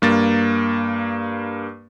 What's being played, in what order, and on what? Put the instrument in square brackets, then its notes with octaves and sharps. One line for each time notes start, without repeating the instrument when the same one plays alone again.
[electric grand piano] G2 A#3 A6